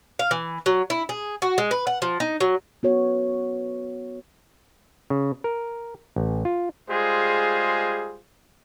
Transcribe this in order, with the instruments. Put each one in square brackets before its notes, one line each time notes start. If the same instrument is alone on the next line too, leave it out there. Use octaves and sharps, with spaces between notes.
[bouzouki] F5
E3
F#3
E4
G#4
F#4
G#3
B4
F#5
F3
D#4
F#3
[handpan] B3 F#4 C#5
[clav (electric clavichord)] C#3
A#4
A1
F4
[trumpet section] G3 G#3 F4 G#4 C5